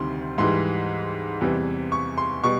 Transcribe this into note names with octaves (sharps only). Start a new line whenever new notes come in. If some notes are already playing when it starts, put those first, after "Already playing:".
Already playing: D2 C3 D#3 G3 C6
G#2 E3 G3 C6
E2 C3 E3 G3
C#6
C6
B2 G3 C#6